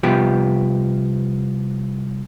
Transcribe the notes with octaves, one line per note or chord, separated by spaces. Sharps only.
C2 F3 B3 G4